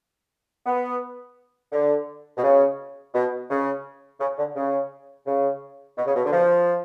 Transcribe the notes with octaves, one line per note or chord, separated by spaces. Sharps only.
B3
D3
B2
C#3
B2
C#3
C#3
D3
C#3
C#3
B2
C#3
B2
D3
F3